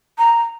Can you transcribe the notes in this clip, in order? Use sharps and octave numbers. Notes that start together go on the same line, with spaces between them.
A#5